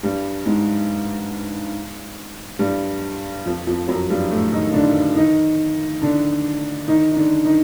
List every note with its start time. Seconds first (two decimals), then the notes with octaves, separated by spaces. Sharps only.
0.03 G2 G3
0.45 G#2 G#3
2.59 G2 G3
3.46 F2 F3
3.67 F2 F3
3.88 F#2 F#3
4.10 G2 G3
4.30 A2 A3
4.52 D#3 D#4
4.74 D3 D4
5.16 D#3 D#4
6.02 D3 D4
6.88 D#3 D#4
7.12 D#4
7.16 D3 D4
7.45 D#3 D#4